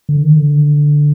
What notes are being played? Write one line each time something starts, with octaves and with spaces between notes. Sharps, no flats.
D3
D#3
D3